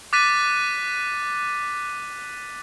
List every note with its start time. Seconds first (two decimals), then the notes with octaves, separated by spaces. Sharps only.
0.13 D6 F#6 A6 B6 D#7